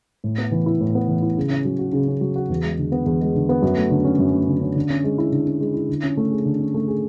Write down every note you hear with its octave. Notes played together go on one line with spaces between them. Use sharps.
A2
B3
E3
E4
A2
B3
E3
E4
C#3
C#4
F#3
F#4
C#3
C#4
F#3
F#4
E2
G#3
D3
B3
E2
G#3
D3
B3
F#2
A3
D3
C#4
F#2
A3
D3
C#4
D3
C#4
G#3
E4
D3
C#4
G#3
E4
D3
C#4
A3
G#4
D3
C#4
A3
G#4